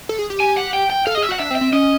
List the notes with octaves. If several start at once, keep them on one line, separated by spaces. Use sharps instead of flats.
A4
G#4
G4
G#5
F#5
G5
G5
A4 F5
G#4 D#5
E5
F#4
F#5
D4 E5
C4
E5
C4
C#4 D#5